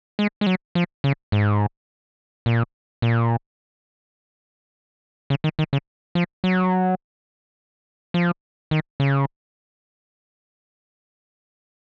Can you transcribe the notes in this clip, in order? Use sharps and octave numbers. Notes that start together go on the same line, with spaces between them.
G#3
G#3
F#3
F3
C#3
G#2
A#2
A#2
C#3
D#3
D#3
C#3
F3
F#3
F3
D#3
C#3